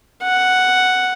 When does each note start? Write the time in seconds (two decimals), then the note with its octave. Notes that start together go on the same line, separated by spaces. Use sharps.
0.23 F#5